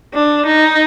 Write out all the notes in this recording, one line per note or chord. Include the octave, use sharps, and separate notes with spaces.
D4
D#4